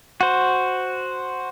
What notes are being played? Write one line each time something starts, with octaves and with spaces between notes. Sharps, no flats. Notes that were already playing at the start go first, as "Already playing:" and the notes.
F#4 C5